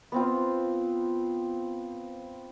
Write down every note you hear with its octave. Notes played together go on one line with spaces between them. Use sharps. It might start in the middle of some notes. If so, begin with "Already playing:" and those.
B3 C4 F4